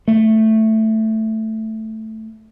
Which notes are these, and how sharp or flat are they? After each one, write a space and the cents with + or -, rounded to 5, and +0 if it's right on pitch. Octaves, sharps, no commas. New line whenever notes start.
A3 +5